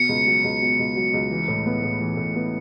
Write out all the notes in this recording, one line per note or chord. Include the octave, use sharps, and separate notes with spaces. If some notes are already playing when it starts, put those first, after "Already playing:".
Already playing: B2 C#7
C#2
F#3
C#2
B2
C#2
F#3
C#2
E3
A2
B3
A2
E3
A2
B3